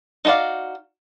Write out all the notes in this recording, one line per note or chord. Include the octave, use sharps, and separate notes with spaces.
D#4 F#4 A#4 D5 F5